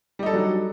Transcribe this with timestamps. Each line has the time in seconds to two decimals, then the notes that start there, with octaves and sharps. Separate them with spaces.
0.19 G3
0.23 D#4
0.26 A4
0.30 D4
0.33 F#3